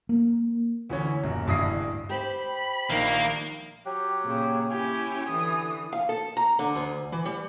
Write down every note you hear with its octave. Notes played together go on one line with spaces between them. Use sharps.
A#3
D2 E3 C#4
D#1 F#2
D1 G2 E4 D#6 A#6 C7
G4 C5 G5 B5
A#1 D#3 A#3
F#3 G4
A#2 C#3
C#4 E4 G4 G#5
D3 E3 D#6
F5
A4
A#5
D3
D2
E3
G3